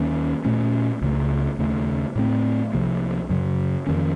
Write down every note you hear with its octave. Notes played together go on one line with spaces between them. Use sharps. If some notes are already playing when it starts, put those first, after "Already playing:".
Already playing: D#2 D#3 A#3 C#4
A#2 A3 C#4
C#2 C#3 A3
D#2 C#3 A3
A2 F#3 A3 C4
C2 C3 F3 A#3
F#2 C#3 F#3
F2 D#3 A#3 C#4